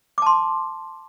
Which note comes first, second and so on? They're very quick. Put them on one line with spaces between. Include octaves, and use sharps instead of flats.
D6 A5 C6